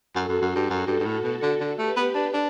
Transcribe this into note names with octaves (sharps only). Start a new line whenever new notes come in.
F#2 F#4 A4
F#2
F#2
G2
F#2
G2
G2
A2
B2
D3
D3
A3 G4 B4
B3
D4
D4